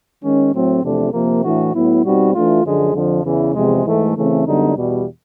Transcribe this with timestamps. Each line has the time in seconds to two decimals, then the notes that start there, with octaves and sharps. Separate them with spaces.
0.22 D#3 G#3 C#4
0.52 A2 F#3 A3 C4
0.82 E2 C3 F3 A3 D4
1.12 C3 F3 A#3
1.42 A2 E3 A3 D4 F#4
1.73 A2 F#3 B3 E4
2.03 B2 G3 C4 D#4 F#4
2.34 E3 A3 D4 F4
2.63 F#2 D3 F3 G#3
2.94 F2 D3 F3
3.24 E2 C#3 E3
3.54 E2 C3 F3 G#3
3.84 G#2 E3 A3
4.15 C#3 E3 A3 C4
4.45 F#2 D3 G3 B3 D#4
4.75 E2 B2 G3